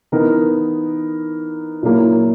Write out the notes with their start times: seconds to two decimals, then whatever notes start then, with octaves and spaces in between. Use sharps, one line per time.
0.12 E3 B3 D#4 A#4
1.83 A#2 F#3 A#3 E4